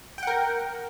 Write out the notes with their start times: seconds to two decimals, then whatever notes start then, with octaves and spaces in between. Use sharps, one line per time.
0.18 G5
0.23 F#5
0.27 A#4